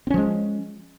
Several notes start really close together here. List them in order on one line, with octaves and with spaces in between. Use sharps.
C4 C#4 F3 G#3